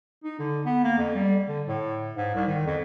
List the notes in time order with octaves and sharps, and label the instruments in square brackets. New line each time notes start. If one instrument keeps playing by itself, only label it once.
[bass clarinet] D#4
D3
B3
A#3
F2
G3
D3
A2
G#2
C2
D#3
F2